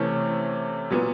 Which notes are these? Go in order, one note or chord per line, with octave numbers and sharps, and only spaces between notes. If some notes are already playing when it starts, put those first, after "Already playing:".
Already playing: C3 E3 A3 C#4
A#2 F#3 B3